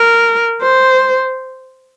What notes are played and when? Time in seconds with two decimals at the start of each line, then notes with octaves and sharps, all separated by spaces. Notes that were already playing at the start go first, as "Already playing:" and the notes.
Already playing: A#4
0.62 C5